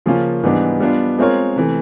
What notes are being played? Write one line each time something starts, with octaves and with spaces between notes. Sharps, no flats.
C#3 F3 A#3 C#4 F4
G#2 E3 G3 B3 D4
G3 B3 D4 F4
G#3 C4 F4 A#4 C#5
C3 E3 A3